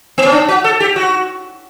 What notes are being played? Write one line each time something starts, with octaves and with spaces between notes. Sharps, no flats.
B3
C#4
D4
F#4
A4
G4
F#4